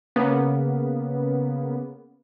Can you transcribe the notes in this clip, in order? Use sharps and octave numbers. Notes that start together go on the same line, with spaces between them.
C#3 A#3 B3